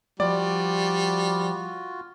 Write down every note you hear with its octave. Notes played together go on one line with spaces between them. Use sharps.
F3 G3 F4 F#4 D5